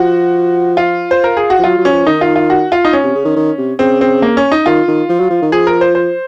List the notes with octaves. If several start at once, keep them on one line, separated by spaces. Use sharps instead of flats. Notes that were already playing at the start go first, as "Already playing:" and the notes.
Already playing: F3 F#4
F4
C5
A#4
G#4
F#4
F3
F#3 F4
F#3
C#4
F3
D#3 D#4
F4
F4
F#4
F4
D#4
C#4
C3
C#3
D#3
D#3
C3
C#3 C4
C4
A#3
C#4
D#4
D#3 F4
D#3
F3
F#3
F3
D#3
F3 G#4
A#4
C5
C5